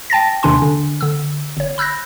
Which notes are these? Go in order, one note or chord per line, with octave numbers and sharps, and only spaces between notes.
G5 A5 A6 A#6
D#2 C3 D#3 D4 G#5 C6
D3 D4
D3 E6
G1 C#5
B5 E6 F#6 G6 A#6